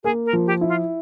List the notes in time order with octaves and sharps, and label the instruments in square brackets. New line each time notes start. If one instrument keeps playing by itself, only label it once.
[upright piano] A#3 [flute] G#4
[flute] A#4
[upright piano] F3
[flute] G4
[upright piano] E4
[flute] F4